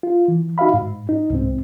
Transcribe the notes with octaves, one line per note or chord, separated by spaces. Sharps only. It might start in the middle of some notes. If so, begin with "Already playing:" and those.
F4
E3
D#4 F#4 E5 F5 B5
G#2
D#4
C2 G#2 C4